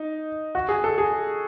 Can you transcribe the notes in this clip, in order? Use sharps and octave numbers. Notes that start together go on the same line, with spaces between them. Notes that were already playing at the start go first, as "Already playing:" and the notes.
Already playing: D#4
F#4
G#4
A4
G#4